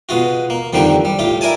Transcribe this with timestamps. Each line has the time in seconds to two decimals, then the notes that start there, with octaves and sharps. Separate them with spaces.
0.09 B2 G#3 F4 F#4
0.50 A#3
0.73 F2 D3 D#3 G3 A#3 G5
1.05 G3
1.19 A2 F4 G4
1.41 E4 A#4 D5 G#5 A5